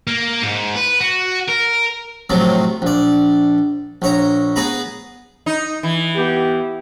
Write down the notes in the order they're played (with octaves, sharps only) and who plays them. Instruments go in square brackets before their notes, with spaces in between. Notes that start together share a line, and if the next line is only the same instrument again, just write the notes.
[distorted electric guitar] A#3
G#2
B4
F#4
A#4
[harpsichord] A2 C3 F3 F#3
A#1 D5
A#1 C#5 A#5
B3 G#4 G#5 A#5 B5
[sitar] D#4
E3
[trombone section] B3 G4